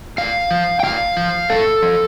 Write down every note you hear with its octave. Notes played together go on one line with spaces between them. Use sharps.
A2 F5
F3
G5
A2 F5
F3
A2 A4
F3